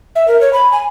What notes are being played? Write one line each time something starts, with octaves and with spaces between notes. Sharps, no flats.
E5
A#4
C#5
B5
G#5